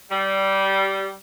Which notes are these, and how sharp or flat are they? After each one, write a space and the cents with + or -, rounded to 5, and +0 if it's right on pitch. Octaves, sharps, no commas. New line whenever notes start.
G3 -15